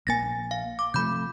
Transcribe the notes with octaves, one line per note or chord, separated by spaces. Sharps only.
A#1 A#3 G#5 A6 A#6
F5
D6
C3 F3 A3 B5 G6